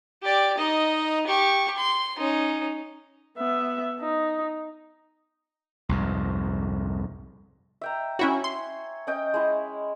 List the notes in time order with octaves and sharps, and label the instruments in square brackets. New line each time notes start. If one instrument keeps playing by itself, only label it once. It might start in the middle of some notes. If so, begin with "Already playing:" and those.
[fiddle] G4 D5
D#4 D#5
G4 C#6
C6
C#4 D#4
[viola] B3 E5
D#4
[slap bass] C2 F2 G#2
[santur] E5 G5 A#5
[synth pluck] C#4 E4 F#4 [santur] C#5 G#5
[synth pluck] C6
[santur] C#4 D#5 G5
G#3 E4